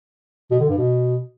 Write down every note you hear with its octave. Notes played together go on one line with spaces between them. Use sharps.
B2
D3
G2
B2